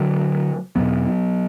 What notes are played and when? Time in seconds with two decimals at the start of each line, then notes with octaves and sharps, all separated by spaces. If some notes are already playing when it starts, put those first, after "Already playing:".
Already playing: D3 F#3
0.76 E2 B2 F#3 B3